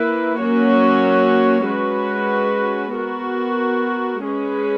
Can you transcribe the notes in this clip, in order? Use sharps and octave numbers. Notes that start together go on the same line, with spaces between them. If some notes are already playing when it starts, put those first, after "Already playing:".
Already playing: A#3 E4 B4
F#3 A#3 C#4 F#4 C#5
G#3 C#4 F#4 B4
B3 F#4 A#4
G#3 C#4 G#4 B4